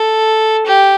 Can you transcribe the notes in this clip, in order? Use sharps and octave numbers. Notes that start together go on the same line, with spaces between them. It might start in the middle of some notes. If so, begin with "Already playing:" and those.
Already playing: A4
G4